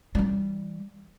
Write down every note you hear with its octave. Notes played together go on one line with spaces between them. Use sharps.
E3 G3